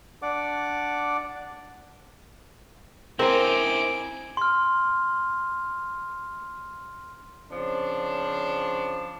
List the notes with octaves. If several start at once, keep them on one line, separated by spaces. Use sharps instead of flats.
D4 D5 F#5 D6
C4 D#4 E4 A#4 C5 G#5 D6
C6 F6
C#3 F3 C4 D4